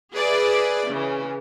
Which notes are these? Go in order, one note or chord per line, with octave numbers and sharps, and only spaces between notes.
G#4 B4 D5 E5
C#3 E3